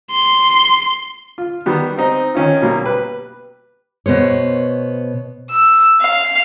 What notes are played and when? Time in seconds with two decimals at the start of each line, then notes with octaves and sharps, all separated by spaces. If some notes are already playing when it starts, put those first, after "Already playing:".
0.12 C6
1.38 F4
1.66 D#3 G3 B3 F#4
1.97 C4 D#4 D#5
2.34 D#3 C#4 D#4 F4
2.62 B2 F#3 G3 A#3
2.83 G4 B4
4.06 B2 B3 C5 C#5
5.50 E6
6.01 F5 F6